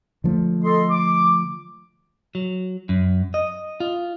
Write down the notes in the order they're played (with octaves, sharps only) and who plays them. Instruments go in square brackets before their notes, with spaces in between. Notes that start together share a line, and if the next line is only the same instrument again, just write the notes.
[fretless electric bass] D3 F3 A3
[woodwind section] A4 D#5 C6
D6
[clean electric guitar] F#3
F#2
D#5
F4